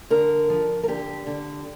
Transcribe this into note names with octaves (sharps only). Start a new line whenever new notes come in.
D3 A#4
F3
A#4
D3 G4
D3